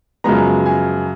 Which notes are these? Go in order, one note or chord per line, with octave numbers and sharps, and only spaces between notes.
F#2 C#3 F3 G#3 B3 A#5
G#5